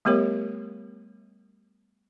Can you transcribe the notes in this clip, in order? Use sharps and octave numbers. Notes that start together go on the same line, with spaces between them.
G3 A3 B3 G4 A#4 C#5